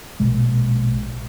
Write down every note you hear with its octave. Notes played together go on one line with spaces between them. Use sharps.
A#1 B2 G#3